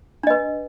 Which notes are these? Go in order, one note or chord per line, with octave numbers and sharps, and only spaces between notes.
D4 B4 D#5